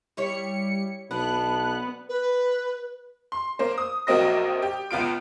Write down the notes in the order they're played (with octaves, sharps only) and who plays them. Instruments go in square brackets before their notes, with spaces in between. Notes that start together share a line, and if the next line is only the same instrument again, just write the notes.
[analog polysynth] G3 C#7 [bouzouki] E4 C#5
[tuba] B1 [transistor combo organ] B3 [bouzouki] D4 [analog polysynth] F#6
[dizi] B4
[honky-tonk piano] C6
A#3 C5
D#6
A#1 F#3 A#3 C4 D#5 A#6
G4
C#2 B3 F4 D7